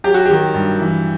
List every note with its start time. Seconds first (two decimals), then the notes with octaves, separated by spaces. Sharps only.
0.04 F#3 G4
0.14 F#4
0.25 D#3 G4
0.54 G2
0.80 E3